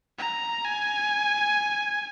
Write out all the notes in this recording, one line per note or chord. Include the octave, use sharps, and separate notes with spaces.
A#5
G#5